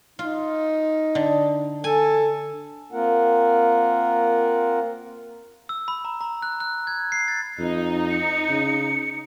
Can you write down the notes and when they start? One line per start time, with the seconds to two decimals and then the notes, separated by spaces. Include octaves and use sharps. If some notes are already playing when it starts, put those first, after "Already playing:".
0.19 D#4 F4
1.15 D3
1.84 A4 G#5
2.92 A#3 C4 F4 A#4 F#5
5.69 E6
5.88 B5
6.05 A#5
6.21 A#5
6.42 F#6
6.60 F#6
6.87 G#6
7.12 C7
7.28 A6
7.59 F2 D#4
8.10 C#7
8.49 C#3